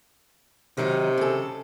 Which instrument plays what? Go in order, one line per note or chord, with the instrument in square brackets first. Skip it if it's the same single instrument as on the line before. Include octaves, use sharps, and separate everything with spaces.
[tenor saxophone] C3 [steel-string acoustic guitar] D#3 F#3 D#4
[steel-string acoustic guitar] C#3 A4